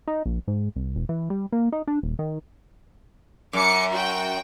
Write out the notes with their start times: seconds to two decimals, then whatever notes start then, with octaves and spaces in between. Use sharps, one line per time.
0.08 D#4
0.26 A#1
0.48 G#2
0.76 C2
0.96 E1
1.09 E3
1.30 G3
1.52 A#3
1.72 D#4
1.88 D4
2.03 D#1
2.19 D#3
3.53 F#2 D6 C#7
3.93 F#4 G5